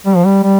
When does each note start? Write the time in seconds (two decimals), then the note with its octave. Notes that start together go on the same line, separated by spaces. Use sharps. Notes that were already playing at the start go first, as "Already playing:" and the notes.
0.06 G3
0.16 F3
0.25 G3
0.43 G3